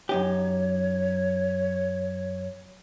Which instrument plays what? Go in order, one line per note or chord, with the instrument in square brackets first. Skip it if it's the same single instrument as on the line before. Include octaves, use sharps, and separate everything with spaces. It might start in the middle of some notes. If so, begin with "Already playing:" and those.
[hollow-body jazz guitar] F#2 D#4 G4 [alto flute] C#5